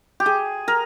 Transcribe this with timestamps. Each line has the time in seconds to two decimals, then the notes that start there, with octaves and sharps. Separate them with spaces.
0.20 G4
0.26 G#4
0.68 A#4